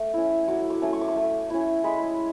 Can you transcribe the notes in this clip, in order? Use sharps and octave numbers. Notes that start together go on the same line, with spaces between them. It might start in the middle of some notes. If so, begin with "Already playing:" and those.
Already playing: A3
C#4 E4
F#3 D6
D6
A3 C#4
C#6
D6
C#6
A3
C#4 E4
G#3 B5